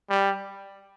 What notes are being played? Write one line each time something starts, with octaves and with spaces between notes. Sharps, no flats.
G3